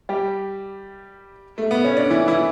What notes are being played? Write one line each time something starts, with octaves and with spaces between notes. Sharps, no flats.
G3 G4
A3
B3
C#4
D4
E3 E4
E3 E4